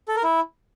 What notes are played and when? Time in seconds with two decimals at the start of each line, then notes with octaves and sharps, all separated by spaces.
0.08 A4
0.16 A#4
0.23 E4